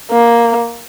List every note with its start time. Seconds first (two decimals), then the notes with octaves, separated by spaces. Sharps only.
0.11 A#3